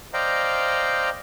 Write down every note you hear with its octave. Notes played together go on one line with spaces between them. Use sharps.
C5 D5 D#5 F5 G5 A#5